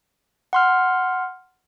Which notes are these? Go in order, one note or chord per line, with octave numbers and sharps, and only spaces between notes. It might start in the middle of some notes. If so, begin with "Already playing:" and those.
F#5 C6 F6